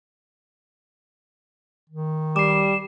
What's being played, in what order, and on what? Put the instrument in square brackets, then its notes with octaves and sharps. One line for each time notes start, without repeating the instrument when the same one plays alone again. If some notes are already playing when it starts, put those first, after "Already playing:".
[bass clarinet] D#3
[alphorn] G3 [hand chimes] D6 C7 [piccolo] E7